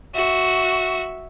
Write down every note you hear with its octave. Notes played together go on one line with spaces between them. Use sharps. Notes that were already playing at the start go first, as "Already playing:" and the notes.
F#4 E5